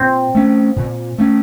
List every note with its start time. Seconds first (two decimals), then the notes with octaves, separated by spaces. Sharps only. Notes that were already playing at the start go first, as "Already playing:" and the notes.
Already playing: A#2 C4
0.35 A3 C#4
0.76 A#2
1.18 A3 C#4